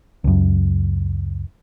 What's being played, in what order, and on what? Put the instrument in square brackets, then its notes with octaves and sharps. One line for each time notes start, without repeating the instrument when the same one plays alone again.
[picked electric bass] C#2 F#2